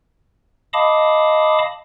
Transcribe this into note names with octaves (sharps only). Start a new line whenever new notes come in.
D#5 F5 A5 B5 D6 D#6